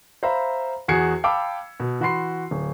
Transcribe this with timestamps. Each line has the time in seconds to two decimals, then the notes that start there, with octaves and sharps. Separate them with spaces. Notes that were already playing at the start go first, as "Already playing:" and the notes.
0.23 C5 E5 F5 A#5 B5
0.88 E2 F#4 G#4 G#6 C7 C#7
1.24 F5 G5 A5 B5 D6 E6
1.80 B2
2.00 E3 F#4 B5 C6 C7
2.51 D1